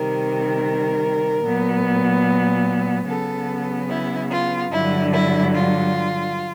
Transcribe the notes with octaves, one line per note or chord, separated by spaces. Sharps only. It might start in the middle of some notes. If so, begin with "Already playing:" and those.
Already playing: C3 D#3 G3 A#4
A#2 F#3 B3
C#3 F#3 B3 A4
E4
F4
G2 D3 F#3 E4
E4
F4